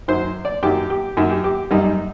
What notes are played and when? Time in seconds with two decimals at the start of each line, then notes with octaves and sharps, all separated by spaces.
0.08 F#2 D#3 F#3 C5
0.45 D5
0.63 F#2 D#3 F#3 G4
0.90 G4
1.17 F#2 D#3 F#3
1.30 G4
1.44 G4
1.71 F#2 D#3 G3 D#4
1.84 D#4